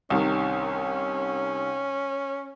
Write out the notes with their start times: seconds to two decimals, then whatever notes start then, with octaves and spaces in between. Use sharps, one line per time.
0.10 C2 C3 D#3 C#4